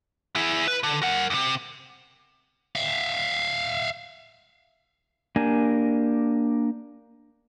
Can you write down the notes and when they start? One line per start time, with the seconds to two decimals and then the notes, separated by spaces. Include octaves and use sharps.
0.36 E4 G#4
0.68 B4
0.83 D3
1.03 A#4 F#5
1.30 E2 C3
2.76 E5 F5
5.36 A#3 D4 G4 A#4 G#5